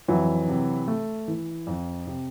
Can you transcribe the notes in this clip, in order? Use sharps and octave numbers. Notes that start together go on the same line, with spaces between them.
F2 E3 F#3
C3
A3
E3
F2
C3